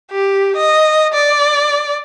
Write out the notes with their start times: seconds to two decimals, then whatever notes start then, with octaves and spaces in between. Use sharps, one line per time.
0.12 G4
0.56 D#5
1.14 D5